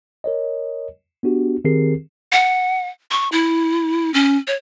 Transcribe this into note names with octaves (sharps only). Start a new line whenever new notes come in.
A#4 C#5 D#5
B3 D4 F#4 G4
D#3 C4 G4 G#4 A#4 C7
F#5
C#6
E4
C#4
C#5